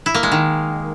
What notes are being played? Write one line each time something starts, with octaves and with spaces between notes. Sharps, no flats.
E4
A#3
G#3
D#3